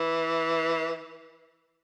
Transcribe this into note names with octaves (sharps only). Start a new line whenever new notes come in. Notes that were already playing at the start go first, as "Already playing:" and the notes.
Already playing: E3